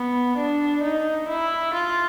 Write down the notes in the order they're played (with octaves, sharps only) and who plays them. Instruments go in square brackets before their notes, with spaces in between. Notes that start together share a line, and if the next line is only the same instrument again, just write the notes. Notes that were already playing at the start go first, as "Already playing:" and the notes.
Already playing: [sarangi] B3
D4
D#4
E4
F4